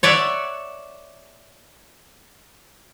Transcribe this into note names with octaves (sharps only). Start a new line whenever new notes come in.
C#5 D5 E5 F#5